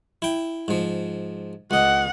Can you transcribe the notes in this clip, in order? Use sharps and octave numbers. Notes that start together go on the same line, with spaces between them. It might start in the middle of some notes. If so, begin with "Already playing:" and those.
E4 G5
G#2 F3
C#2 D#5 F#5